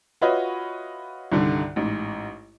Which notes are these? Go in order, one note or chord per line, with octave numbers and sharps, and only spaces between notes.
F4 F#4 B4 C#5 D#5 E5
C2 G2 D3 D#3
A1 G#2